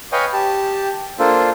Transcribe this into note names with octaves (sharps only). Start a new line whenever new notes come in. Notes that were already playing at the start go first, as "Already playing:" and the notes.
B4 C#5 D#5 F5 G5 G#5
G4 A5
A#3 D4 F4 A4 C5